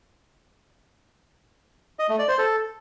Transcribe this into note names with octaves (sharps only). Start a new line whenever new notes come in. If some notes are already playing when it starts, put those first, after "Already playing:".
D#5
A3
D5
C5
A4